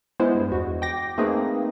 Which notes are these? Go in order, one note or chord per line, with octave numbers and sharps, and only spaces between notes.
G#3 B3 E4 C5
G2
E2 F#4
G5 D6 A#6
A3 A#3 C4 D#4 G#4 B4